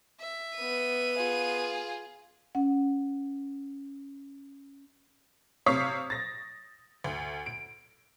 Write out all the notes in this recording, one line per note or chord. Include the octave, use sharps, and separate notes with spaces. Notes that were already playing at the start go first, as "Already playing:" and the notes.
E5
B3 D#7
F4 G#4
C#4 F#5
C3 C#5 F5 C#6 D#6 B6
A6 A#6
D2
D7